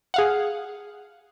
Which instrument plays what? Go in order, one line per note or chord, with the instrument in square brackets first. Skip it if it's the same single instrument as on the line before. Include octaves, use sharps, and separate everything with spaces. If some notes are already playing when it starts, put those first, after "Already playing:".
[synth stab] G#4 F5 F#5